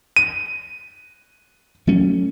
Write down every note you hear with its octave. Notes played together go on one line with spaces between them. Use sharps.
D#7
F#3 A3 C#4